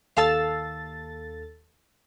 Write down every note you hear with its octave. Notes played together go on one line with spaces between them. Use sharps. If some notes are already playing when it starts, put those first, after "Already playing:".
D#2 A4 F5 A5 E6 A6